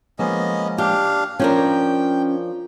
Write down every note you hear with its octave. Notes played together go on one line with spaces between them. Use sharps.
F3 G#3 A#3 B3 C#4 D#5
D4 G4 F5
F3 C#4 D4 A#4 G5